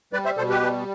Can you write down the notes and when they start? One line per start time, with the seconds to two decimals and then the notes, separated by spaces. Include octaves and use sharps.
0.13 G3 B4 D5
0.25 C5 E5
0.37 B2 A4 C5
0.50 G4 B4
0.62 G3